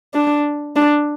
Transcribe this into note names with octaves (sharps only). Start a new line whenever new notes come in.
D4
D4